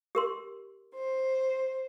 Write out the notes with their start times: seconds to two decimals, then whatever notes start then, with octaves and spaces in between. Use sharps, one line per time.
0.15 G4 A#4 C6
0.94 C5